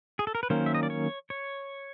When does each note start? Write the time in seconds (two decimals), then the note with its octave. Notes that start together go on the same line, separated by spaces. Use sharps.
0.19 G#4
0.27 A4
0.35 A#4
0.43 B4
0.50 D#3 F#3 A#3 C#4 C5
0.66 E5
0.75 D#5
0.83 D5
0.90 C#5
1.30 C#5